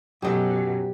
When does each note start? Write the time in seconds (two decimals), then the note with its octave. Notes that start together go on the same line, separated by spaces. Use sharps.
0.22 F#2 B2 F#3 G4 A4 D#5